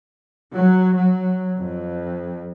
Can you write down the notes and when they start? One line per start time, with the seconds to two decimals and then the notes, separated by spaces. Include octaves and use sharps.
0.53 F#3
0.95 F#3
1.62 F2